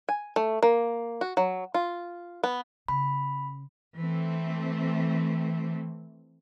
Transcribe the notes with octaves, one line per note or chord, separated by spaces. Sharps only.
G#5
A3
A#3
F#4
F#3
F4
B3
C#3 B5
E3 A3 C4